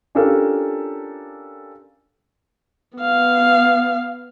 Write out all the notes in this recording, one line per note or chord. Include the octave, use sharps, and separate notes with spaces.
C#4 D4 F4 G4 A4 A#4
B3 F5